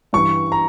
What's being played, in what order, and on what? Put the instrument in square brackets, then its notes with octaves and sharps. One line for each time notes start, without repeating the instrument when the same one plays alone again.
[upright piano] G2 E3 G3 [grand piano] C#6
[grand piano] A#5